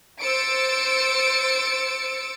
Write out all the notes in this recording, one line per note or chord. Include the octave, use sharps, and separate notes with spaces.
C5 E6 A6 C#7 D7